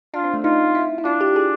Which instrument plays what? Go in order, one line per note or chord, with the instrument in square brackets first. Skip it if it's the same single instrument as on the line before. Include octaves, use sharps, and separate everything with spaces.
[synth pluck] D4 [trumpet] F4
[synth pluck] C4
A3
[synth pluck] D#4 [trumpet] F4
[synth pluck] E4
E4
[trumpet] D4 [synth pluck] F4
[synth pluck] G4
G#4